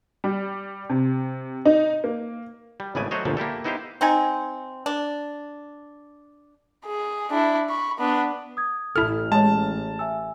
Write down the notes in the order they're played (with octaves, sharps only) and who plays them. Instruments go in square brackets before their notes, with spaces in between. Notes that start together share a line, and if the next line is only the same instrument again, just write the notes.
[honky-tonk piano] G3
C3
D#4
A#3
[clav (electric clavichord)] G3
G#1 A2 C#3 B3 D5 G#5
F#3 A3 F#4 C5 C#5 D#5
G1 D2 A#2 F3
A#3 E4 G4 A4
B3 D#4 E4 G4 C5 F5
[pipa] C4 D#4 G#5
D4
[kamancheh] G#4
D4 E4
B5 C#6
B3 D4
[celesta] D#6 G#6
[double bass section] A1 [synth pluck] E4 A4 [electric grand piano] F6
[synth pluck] G#3 [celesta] G#4 C#5 [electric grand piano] A5
[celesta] E5 G#5 E6